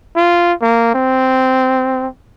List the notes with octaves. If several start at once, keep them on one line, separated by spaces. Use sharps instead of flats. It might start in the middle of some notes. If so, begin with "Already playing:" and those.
F4
A#3
C4